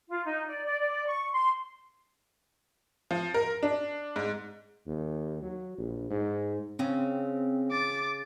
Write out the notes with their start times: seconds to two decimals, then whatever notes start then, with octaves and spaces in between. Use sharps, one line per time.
0.09 F4
0.25 D#4
0.47 D5
0.65 D5
0.80 D5
1.06 C#6
1.33 C6
3.11 F3
3.34 A#4
3.63 D4
4.16 G#2
4.87 D#2
5.42 F#3
5.78 A#1
6.10 G#2
6.79 C#3 C4
7.72 D6 A6